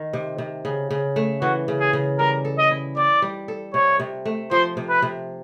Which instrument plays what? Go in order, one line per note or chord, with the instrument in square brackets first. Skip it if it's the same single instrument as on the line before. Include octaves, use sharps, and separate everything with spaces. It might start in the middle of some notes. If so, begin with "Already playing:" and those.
Already playing: [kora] D#3
C3
C3
C#3
C#3
A3
[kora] E3 [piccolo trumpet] F#4
[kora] C#3
[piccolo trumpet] G#4
[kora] C#3
[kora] G3 [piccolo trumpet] A#4
[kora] A4
[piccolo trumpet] D#5
[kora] E4
[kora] C4 [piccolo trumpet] D5
[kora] G3
A4
[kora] C3 [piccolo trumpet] C#5
[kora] C3
A3
[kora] F3 [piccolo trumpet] C5
[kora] C3
[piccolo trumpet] B4
[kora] C3